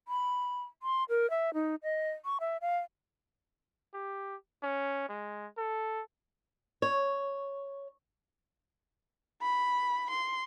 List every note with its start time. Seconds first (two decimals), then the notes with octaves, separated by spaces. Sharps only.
0.08 B5
0.83 C6
1.09 A#4
1.30 E5
1.54 D#4
1.83 D#5
2.25 C#6
2.40 E5
2.61 F5
3.94 G4
4.63 C#4
5.09 G#3
5.58 A4
6.82 C#5
9.42 B5
10.11 C6